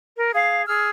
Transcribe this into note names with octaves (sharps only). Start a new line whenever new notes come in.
A#4
G#4 F5
G#4 E6 F6